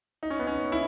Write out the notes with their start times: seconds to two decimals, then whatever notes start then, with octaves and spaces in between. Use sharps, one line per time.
0.23 D#4
0.30 C#4
0.39 B3
0.47 C#4
0.72 E4